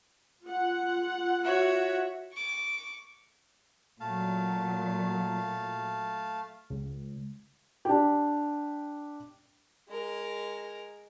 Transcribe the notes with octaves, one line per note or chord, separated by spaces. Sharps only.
F4 F#5
F#4 C#5 E5
C#6 D6
A#2 F#3 A3 F5 A5
C#2
D4 G4
G#3 A#4